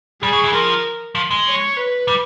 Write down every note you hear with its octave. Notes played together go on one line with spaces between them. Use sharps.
G3 G#4
F#3
E3
F3 A#4
F3
G#3
C#5
B4
G3